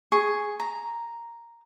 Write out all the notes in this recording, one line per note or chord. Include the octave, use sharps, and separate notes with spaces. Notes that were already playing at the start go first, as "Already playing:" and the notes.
G#4 C#6
A#5